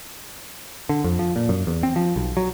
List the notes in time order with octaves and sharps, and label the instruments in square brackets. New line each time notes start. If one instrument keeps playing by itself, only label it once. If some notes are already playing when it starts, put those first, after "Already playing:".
[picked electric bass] D3
F2
F3
A#2
F#2
E2
C4
F3
B1
F#3